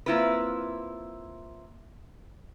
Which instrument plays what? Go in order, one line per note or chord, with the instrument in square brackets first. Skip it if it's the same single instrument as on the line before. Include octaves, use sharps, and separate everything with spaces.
[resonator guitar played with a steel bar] A#3 C4 E4 F4 B4